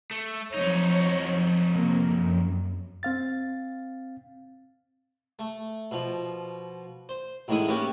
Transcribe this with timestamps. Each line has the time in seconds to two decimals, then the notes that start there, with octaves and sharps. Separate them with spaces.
0.11 A3
0.54 F2 F3 F#3 D#4 C#5
1.71 C3 A#3
2.12 F#2
3.03 C4 F5 A6
5.39 A3
5.91 B2 F3
7.09 C5
7.48 A1 A2 D#3 G#3 E4 D#6
7.68 A#3 B3 C#4 F#4 G4